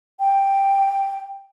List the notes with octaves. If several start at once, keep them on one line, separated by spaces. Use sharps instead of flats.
G5